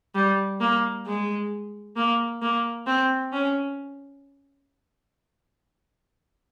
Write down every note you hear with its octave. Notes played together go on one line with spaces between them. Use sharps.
G3
A#3
G#3
A#3
A#3
C4
C#4